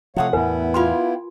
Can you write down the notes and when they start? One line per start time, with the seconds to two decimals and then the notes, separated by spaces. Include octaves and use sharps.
0.16 C3 F3 A3 F#4 C#5 F5 F#5 D#6
0.33 E2 A2 B3 E4 A#4 B4 G#5
0.74 F4 G4 F5 G#5 C6